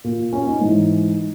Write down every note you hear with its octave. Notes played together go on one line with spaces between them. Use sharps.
A#2
C#4
D#4
G#2 E3